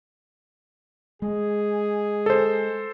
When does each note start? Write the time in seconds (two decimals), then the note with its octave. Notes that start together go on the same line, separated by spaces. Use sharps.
1.22 G#3 G#4
2.26 A4 C5